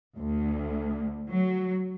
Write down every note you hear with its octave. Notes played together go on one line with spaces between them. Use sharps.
D2
F#3